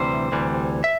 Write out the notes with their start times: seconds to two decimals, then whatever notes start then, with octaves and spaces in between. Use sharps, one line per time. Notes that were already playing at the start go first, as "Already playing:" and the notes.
Already playing: D2 C3 E3 G3 C5
0.32 D2 C3 E3 G3
0.84 E5